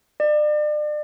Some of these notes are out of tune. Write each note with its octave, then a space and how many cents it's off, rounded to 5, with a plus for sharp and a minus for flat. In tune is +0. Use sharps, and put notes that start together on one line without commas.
D5 +35